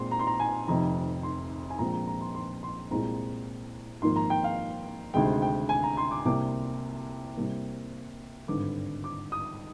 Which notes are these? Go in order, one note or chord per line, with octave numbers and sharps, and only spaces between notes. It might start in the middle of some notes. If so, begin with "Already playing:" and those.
Already playing: A#2 G#3 C4 C6
A#5
C6
A#5
G#5
F1 F2 C3 D#3 A#5
C6
G#5
A#1 A#2 G#3 C4 A#5
A#5
A#5
C6
C6
C6
C2 A#2 G#3 C4 A#5
G#1 G#2 F3 A#3 C6
A#5
G5
F5
D2 C3 D#3 G#3 G5
G5
G#5
A#5
C6
D6
C2 C3 G3 A#3 D6
C2 C3 G3 A#3
G#1 G2 D3 D6
D6
D#6